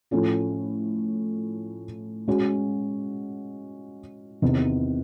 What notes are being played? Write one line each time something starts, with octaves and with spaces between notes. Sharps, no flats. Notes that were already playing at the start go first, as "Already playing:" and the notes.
A2 F3 A3 C#4 F4
G#3 C#4 F#4
E2 C3 D#3